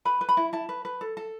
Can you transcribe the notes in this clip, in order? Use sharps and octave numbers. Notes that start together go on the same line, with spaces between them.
B4 B5
B4
B5
E4
E4 A5
B4
B4
A4
A4